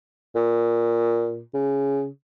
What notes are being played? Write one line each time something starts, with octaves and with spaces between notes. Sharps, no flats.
A#2
C#3